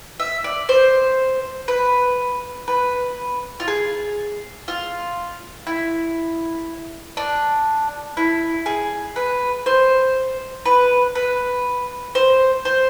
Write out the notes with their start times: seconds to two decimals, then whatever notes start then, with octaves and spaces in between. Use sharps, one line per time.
0.20 E5
0.44 D5
0.69 C5
1.68 B4
2.68 B4
3.60 F4
3.68 G#4
4.68 F4
5.67 E4
7.17 D4
8.17 E4
8.66 G#4
9.16 B4
9.66 C5
10.66 B4
11.15 B4
12.15 C5
12.65 C5